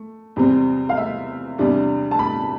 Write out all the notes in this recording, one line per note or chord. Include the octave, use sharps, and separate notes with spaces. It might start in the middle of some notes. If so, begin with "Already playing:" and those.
Already playing: A3
E2 C3 G3 C4
F5
E5
E2 C3 G3 D4
A5
B5